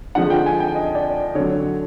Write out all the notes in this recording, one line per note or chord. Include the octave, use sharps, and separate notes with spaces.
D3 F3 G#3 F#5
G5
G#5
G5
D#5
D5
D3 F#3 C#5